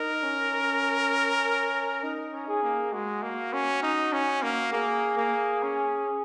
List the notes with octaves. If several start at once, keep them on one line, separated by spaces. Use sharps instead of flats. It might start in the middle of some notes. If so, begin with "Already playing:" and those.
Already playing: D#4 A#4
C#4
D#4
C#4
G#4
A#3
G#3 F#4
A#3
C#4
D#4
C#4
A#3
A#3 G#4
A#3
C#4